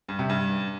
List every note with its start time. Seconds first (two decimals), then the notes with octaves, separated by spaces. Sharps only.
0.08 G2
0.19 C3
0.29 G2